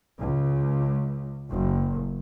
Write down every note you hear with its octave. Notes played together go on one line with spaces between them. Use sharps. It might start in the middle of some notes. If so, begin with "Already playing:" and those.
C#2
F#1